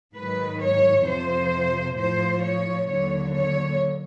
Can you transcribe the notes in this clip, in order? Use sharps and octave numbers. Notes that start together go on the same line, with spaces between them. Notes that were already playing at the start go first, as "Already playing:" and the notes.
G#2 D#3 F#3 B4
C#5
F2 C3 F3 C5
A2 F3 C5
C#5
D#2 D3 F#3 C#5
C#5